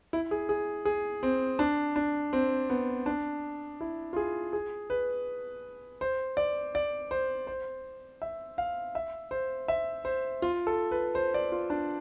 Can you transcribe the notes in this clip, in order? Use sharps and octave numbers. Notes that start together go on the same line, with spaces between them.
E4
G#4
G#4
G#4
C4
D4
D4
C4
B3
D4
E4
F4
G#4
G#4
B4
C5
D5
D5
C5
C5
E5
F5
E5
C5
E5
C5
F4
A4
B4
C5
D5
F4
D4